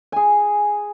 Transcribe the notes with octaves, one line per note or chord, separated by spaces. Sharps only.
G#4 G#5